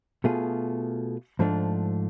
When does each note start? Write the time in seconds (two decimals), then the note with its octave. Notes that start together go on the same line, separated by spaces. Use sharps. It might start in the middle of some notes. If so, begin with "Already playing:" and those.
0.24 B2 A3 F4 G#4
1.39 G#2 F3 A3 D4